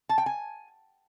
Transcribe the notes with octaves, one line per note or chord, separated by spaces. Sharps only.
A5
G5
G#5